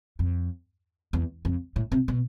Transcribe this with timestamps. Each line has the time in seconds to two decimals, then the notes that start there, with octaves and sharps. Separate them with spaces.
0.19 F2
1.13 E2
1.45 F2
1.76 A2
1.92 C3
2.08 B2